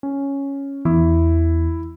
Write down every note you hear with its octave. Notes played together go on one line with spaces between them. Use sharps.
C#4
E2 E4